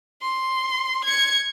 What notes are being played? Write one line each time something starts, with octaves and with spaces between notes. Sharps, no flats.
C6
G#6 C#7